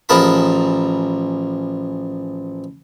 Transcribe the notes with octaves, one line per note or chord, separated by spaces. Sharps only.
A1 F3 G#4 A#4 A5 B5